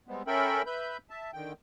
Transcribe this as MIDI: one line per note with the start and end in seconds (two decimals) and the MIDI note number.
0.08 0.23 55
0.08 0.23 56
0.08 0.23 59
0.08 0.23 60
0.27 0.62 61
0.27 0.62 69
0.27 0.62 70
0.27 0.62 76
0.27 0.62 79
0.27 0.62 83
0.66 0.97 71
0.66 0.97 76
0.66 0.97 83
0.66 0.97 91
1.10 1.31 76
1.10 1.31 81
1.33 1.53 50
1.33 1.53 51
1.33 1.53 79